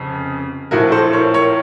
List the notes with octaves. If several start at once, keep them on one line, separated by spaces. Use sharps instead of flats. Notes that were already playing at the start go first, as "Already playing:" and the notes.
Already playing: F1 F2 C#3
A#1 A2 F3 F#4 A#4
A4 C5
A#4 C#5
A#4 C#5